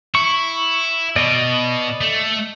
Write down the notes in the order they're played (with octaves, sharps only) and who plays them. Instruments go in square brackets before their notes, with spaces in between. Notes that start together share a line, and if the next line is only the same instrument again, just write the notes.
[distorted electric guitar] E4 [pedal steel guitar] C#6
[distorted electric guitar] B2 [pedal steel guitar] D5 D#5
[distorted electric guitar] A3